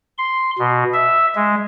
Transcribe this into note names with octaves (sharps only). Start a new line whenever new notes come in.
C6
B2
E5
G#3